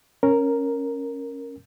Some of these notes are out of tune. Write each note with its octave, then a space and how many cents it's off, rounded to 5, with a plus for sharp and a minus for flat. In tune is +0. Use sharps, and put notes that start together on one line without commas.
C#4 -10 A#4 +0